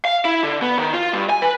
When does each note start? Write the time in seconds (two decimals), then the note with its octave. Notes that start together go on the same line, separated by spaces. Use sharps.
0.05 F5
0.25 E4
0.43 D3
0.62 B3
0.78 D#3
0.93 F4
1.13 G2
1.30 G#5
1.42 B4